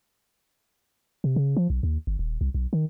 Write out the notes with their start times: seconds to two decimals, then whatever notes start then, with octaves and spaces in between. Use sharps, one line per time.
1.24 C3
1.36 C#3
1.57 F3
1.70 B1
1.83 D#2
2.07 G1
2.19 D#1
2.41 C2
2.54 B1
2.73 D#3